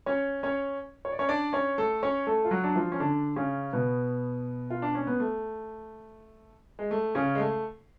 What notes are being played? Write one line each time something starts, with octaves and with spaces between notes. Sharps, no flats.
C#4 C#5
C#4 C#5
C#5
D5
C#4 C#5
D4 D5
C#4 C#5
A3 A4
C#4 C#5
A3 A4
F4
F#3 F#4
D4
F3 F4
C#4
D3 D4
C#3 C#4
B2 B3
F4
D4
C#4
B3
A3
G#3
A3
C#3 C#4
G#3
A3